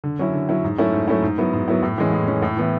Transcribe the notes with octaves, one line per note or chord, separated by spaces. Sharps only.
D3
F#3 C#4 E4
D3
F#3 C#4 E4
G#2
F#3 A3 C#4 E4
G#2
F#3 A3 C#4 E4
G#2
F#3 B3 E4
G#2
F#3 B3 E4
A2
E3 G#3 C#4
A2
E3 G#3 C#4
A2
E3 B3 E4